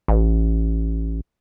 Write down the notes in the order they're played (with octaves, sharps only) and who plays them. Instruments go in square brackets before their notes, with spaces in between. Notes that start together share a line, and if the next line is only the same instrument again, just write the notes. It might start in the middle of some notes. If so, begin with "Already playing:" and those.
[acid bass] A1